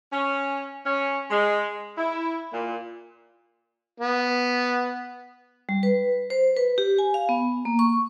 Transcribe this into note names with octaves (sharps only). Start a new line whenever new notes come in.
C#4
C#4
G#3
E4
A#2
B3
G3
B4
C5
B4
G4
G#5
F5
B3
A#3
C#6